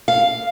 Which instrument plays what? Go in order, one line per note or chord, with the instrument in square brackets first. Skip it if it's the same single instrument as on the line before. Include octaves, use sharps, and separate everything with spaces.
[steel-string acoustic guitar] F5